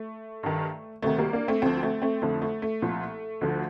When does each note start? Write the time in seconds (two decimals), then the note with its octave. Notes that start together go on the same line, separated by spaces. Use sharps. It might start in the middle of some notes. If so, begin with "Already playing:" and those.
Already playing: A3
0.43 G2 D#3
1.02 D2 C3 D#3 A3
1.18 G3 A#3
1.33 A#3 D4
1.48 A3 C4
1.62 D2 D3 F3 A3 C4
1.83 A3 C4
2.02 A3 C4
2.22 F2 D3 F3 A3
2.42 A3
2.62 A3
2.82 C2 A#2 F3
3.41 D2 D3 F3